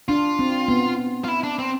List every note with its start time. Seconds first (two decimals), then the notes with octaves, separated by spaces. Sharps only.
0.09 D4 F4
0.39 C4
0.68 B3
1.24 F4
1.28 E4
1.44 D4
1.59 C4